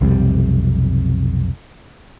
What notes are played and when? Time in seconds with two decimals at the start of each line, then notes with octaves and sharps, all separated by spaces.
0.01 B1 F2 C3 G3